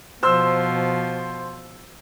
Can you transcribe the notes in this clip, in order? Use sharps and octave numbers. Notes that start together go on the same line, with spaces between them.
B2 F3 C5 C6 E6